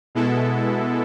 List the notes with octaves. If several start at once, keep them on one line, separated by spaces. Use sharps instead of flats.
B2 G#3 B3 E4 A4